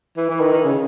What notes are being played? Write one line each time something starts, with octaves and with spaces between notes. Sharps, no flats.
E3
E3
D#3
D#3
C#3